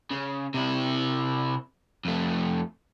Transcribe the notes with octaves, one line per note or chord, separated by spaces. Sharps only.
C#3
C3 E4
F2 A3